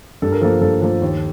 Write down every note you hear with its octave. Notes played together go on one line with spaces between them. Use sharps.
G2 A4
A#4
F3 A#3 A4
G2 A4
F3 A#3
D#2